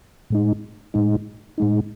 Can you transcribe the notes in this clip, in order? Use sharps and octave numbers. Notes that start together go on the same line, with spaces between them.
A2 G#3 D#4
A2 G#3 D#4
A2 G#3 D#4